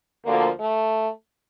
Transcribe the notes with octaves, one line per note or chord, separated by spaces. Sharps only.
D2 D3 F3 A#3
A3